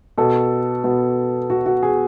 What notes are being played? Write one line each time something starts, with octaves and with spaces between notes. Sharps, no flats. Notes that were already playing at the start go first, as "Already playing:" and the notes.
B2 A4
B2
B2 F#4
F#4
G#4